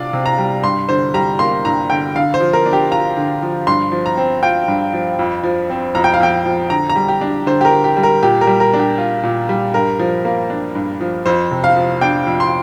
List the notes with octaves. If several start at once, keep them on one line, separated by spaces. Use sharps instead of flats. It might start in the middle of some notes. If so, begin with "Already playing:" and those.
Already playing: C3 D4 F4 D5 F5
C3
A#5
G3
G2 C6
D3 C5
G3 A#5
A#3 C6
G2 A#5
D3 G5
D3 F5
C5
F3
A#4
D4
G4
F4 A#5
D3
F3
G2 C6
F3
A#5
C4
F4 G5
G2
F3
F2
F3
C4
F2 A#5
G5
F5
F2 G5
F3
D3 A#5
A#5
G3
G4
D4
D3 C5
G4
A#4
D3
G4
G3
A#4
A#2 G4
A#4
G3
A#4
D4
G4
F4
A#2
G3
G2 A#4
F3
A#3
D4
G2
F3
F2 C5
C3
F5
F3
D4 G5
F2
C6